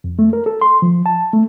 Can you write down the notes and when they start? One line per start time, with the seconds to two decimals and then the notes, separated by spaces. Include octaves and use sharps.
0.04 F2
0.19 A3
0.33 A#4
0.46 A4
0.61 C6
0.82 F3
1.06 A5
1.33 A3